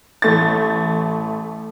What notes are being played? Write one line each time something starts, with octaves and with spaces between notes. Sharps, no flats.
A1 A3 A6